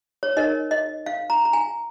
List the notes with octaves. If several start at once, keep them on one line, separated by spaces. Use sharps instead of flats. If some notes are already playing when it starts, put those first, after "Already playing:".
C#5
D#4 A#4 C#5 D#5
D#5
F5
A#5
A#5
G#5